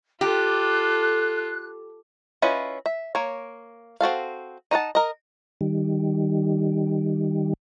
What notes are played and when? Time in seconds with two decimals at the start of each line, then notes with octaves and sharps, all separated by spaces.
0.21 F4 G4 A4 F#6
2.42 C#4 E4 F4 B4 D#5
2.86 E5
3.15 A#3 C#5
4.01 C4 F#4 A4 F5
4.71 D#4 D#5 F#5 A5
4.95 A#4 D#5
5.61 D#3 G3